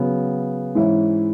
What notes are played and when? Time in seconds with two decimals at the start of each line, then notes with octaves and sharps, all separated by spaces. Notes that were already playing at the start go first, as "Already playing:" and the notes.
Already playing: C#3 F#3 B3
0.75 G#2 E3 C#4 E4